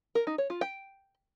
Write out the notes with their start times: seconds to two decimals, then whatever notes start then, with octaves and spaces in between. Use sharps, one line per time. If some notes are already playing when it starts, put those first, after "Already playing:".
0.15 A#4
0.27 D#4
0.38 C#5
0.50 F4
0.61 G5